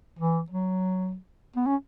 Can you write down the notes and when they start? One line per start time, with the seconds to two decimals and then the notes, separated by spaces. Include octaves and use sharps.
0.19 E3
0.50 F#3
1.56 B3
1.66 C#4